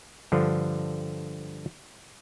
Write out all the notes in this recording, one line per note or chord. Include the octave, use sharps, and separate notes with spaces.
G2 D3 F3